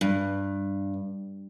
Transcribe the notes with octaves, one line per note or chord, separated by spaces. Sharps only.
G2